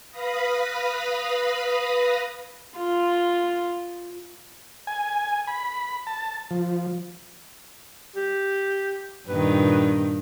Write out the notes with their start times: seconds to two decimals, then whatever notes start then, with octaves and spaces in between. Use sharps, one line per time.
0.11 B4 F5 B5 D#6 A#6
2.77 F4
4.87 G#5
5.48 B5
6.07 A5
6.51 F3
8.16 G4
9.29 G2 A#2 D#3 B4